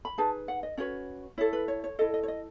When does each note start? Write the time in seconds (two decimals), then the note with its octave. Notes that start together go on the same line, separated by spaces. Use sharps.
0.05 B5
0.18 D#4 G#4 B4 A5
0.48 F#5
0.63 D#5
0.77 C#4 F#4 B4 C#5
1.38 E4 A4 C#5
1.53 B4
1.68 C#5
1.84 C#5
1.99 E4 A4 D#5
2.14 D#5
2.23 C#5
2.28 D#5